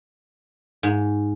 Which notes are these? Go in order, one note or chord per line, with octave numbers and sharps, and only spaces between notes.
G#2